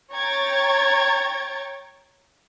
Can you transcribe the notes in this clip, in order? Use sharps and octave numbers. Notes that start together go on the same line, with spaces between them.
C#5 G5 A#5 C#6 G#6 A6